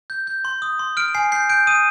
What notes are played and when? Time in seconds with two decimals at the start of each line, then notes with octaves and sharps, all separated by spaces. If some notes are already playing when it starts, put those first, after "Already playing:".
0.10 G6
0.27 G6
0.45 C6
0.62 D#6
0.79 C6
0.97 F6 D7
1.15 G#5 C7
1.32 G6 C7
1.49 G6 D7
1.67 D#6 D#7